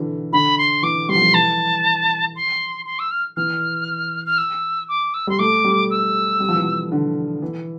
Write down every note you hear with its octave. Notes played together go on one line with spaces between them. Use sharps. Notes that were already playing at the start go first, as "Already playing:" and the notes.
Already playing: D3 E3
D3 B5
C6
E3 D6
G3 C6
F3
G3
E3 A5
C6
C6
E6
F6
E3 F6
F6
E6
D6
E6
G3 C6
A3 D6
G3
E6
G3
F3
E3
F3
D3
E3